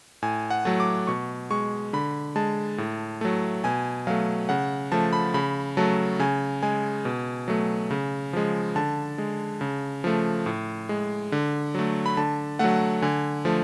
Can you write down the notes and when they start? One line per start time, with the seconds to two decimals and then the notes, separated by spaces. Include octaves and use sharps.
0.22 A2 G#5
0.50 F#5
0.65 F#3 A3
0.80 D6
1.07 B2 C#6
1.50 G#3 C#6
1.93 D3 B5
2.36 G#3 A5
2.78 A2
3.21 F#3 A3
3.64 B2 G#5
4.07 F#3 A3 F5
4.49 C#3 F#5
4.92 F3 A3 A5
5.13 B5
5.34 C#3 B5
5.77 F#3 A3 A5
6.19 C#3 G#5
6.63 G#3 G#5
7.05 B2
7.48 F#3 A3
7.91 C#3
8.33 F3 G#3
8.76 D3 A5
9.18 G#3
9.61 C#3
10.04 F3 A3
10.46 A2
10.89 G#3
11.32 D3
11.75 F#3 A3
12.06 B5
12.17 D3 A5
12.59 F#3 A3 F#5
13.02 D3 G#5
13.45 F3 A3